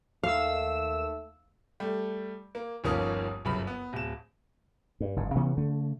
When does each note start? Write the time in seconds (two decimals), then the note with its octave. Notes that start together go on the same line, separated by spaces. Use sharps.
0.23 D#2 A3 F5 E6
1.80 G3 A3
2.55 A#3
2.84 G1 D#2 F3 A#3 C#4 D#6
3.45 G1 F#2 C#3 B5
3.67 B3
3.93 D1 E7
5.00 G2
5.16 F#1 G#2
5.35 C3 E3 B3 C#4
5.57 C#3 A3